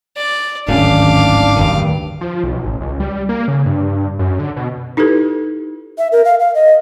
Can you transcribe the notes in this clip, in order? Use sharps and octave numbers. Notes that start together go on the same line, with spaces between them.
D5
D1 G#1 D#3 C#4 D4 F5 D6
D1 B1 G2 D#3
F3
B1
A1
C#2
G3
A#3
C#3
G2
F#2
D3
B2
D#4 E4 G4 A4 B4
E5
A#4
F5
F5
D#5